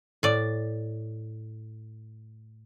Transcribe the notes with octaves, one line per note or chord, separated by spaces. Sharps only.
A2 D5